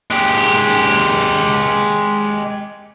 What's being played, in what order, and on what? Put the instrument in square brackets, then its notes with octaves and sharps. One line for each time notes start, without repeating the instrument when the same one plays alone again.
[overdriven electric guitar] G#3 G4